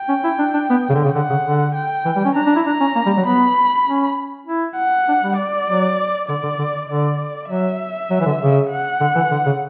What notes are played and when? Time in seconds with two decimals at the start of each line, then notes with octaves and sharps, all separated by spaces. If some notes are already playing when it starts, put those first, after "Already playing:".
Already playing: G5
0.09 C#4
0.24 E4
0.39 D4
0.54 D4
0.70 B3
0.90 C#3
0.94 D3
1.04 C#3
1.14 D3 F#5
1.30 C#3
1.45 D3
1.75 G5
2.05 E3
2.16 G3
2.25 C#4
2.35 D4 A#5
2.46 D4
2.56 E4
2.65 D4 A#5
2.80 C#4
2.96 A#3
3.06 G3
3.17 F#3
3.26 B3 B5
3.87 C#4
4.47 E4
4.77 F#5
5.08 D4
5.22 G3
5.37 D5
5.69 F#3
6.28 D3 D5
6.43 D3
6.59 D3
6.89 D3 D5
7.49 F#3 E5
8.11 F#3
8.20 E3
8.26 D3
8.41 C#3
8.71 F#5
9.01 D3
9.15 E3
9.31 D3
9.46 C#3